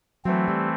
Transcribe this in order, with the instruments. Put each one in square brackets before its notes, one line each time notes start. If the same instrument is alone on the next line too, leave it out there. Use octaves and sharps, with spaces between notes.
[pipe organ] E3 A3 C4 [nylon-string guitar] F#3
[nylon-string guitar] G3